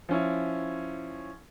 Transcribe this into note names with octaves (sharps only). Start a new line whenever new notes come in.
F3 C#4 E4